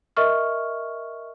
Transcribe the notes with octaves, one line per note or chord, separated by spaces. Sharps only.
A#4 D#5 E5 C#6 F6